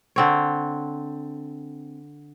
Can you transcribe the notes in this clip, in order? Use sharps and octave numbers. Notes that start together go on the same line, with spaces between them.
D3 C4 C#5